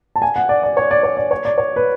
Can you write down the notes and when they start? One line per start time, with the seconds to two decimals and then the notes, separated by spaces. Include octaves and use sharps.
0.16 A5
0.22 G#5
0.36 F#5
0.49 D5
0.63 D5
0.77 C#5
0.91 D5
1.03 C#5
1.17 D5
1.31 C#5
1.45 D5
1.58 C#5
1.76 B4